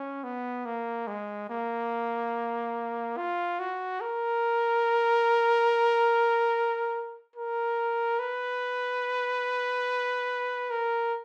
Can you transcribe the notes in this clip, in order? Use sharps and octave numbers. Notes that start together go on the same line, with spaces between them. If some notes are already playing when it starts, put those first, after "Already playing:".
Already playing: C#4
B3
A#3
G#3
A#3
F4
F#4
A#4
A#4
B4
A#4